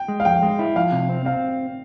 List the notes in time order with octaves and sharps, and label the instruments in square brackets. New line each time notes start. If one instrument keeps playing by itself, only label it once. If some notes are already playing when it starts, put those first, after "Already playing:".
Already playing: [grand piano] G5
[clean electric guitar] G#3
[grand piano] F5
[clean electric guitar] F2 [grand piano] G5
[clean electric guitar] G#3
E4
[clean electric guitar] F3 [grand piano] F5
[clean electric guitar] C3
C4
[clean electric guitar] C4 [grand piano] F5